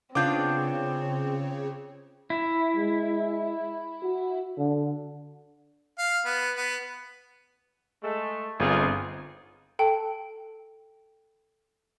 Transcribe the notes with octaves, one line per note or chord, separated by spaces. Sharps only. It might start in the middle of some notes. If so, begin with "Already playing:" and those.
C#3 B3 C4 D4 F4 D6 G6
E4
G#3
F#4
D3
F5
B3
B3
G#3 A3
G1 G#2 C4 F4 G#4
A4 G5 A5